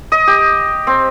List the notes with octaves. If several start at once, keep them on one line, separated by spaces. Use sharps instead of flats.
D#5
G4
C4